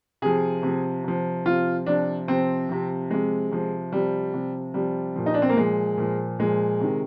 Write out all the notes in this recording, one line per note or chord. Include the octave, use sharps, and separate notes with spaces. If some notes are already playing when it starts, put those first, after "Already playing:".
C3 F3 G#4
C3 F3
C3 F3
C3 F3 F4
C3 F3 D4
C3 F3 C4
C3 F3
C3 F3 G#3
C3 F3
C3 F3 G3
C3 F3
C3 F3 G3
A#2 F3
D#4
D4
C4
A#3
A#2 F3 G#3
A#2 F3
A#2 F3 G#3
C3 D#3